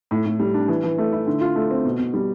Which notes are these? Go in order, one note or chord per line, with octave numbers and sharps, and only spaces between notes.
A2
A2
G3
D4
E3
E3
A3
E4
D3
F4
A3
C4
B2
B2
G3